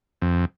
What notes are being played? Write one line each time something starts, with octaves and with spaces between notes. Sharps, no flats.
F2